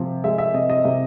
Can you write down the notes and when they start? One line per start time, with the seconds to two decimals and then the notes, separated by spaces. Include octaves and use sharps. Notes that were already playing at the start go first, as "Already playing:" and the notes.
Already playing: C3 F3
0.24 G#3 E5
0.38 E5
0.54 C3 D#5
0.70 D#5
0.84 C3 E5